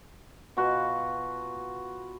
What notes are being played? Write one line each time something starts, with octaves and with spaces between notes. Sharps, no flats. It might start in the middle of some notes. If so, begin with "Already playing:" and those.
B2 F4 F#4 B4